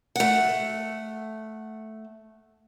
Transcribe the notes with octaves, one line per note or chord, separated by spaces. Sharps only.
A3 F#5